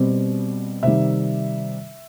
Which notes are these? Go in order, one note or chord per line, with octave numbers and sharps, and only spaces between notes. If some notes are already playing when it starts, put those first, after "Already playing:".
Already playing: B2 G3 C4
C3 D#3 G3 E5